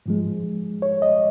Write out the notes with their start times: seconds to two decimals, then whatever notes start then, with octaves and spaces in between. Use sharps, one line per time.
0.06 G#2 F3 G#3
0.82 C#5
1.02 D#5